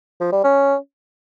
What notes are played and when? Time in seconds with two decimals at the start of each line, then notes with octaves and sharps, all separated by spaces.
0.21 F3
0.33 G3
0.44 C#4